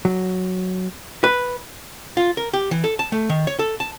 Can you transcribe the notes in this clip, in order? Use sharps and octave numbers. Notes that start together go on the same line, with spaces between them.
F#3
B4
F4
A#4
G4
E3
A4
A5
A3
D#3
C#5
A4
A5